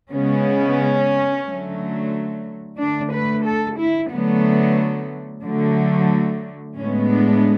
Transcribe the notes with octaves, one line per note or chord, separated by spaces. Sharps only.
C#3 G#3 B3 C#4
D3 F#3 A3
D3 A3 D4
B4
A4
E4
D3 F#3 A3 B3
D3 F#3 A3
A2 G#3 B3 C#4
D4